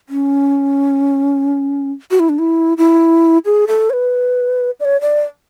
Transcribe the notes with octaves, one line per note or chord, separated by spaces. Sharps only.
C#4
F#4
E4
D4
E4
E4
G#4
A4
C#5
B4
D5
C#5
D5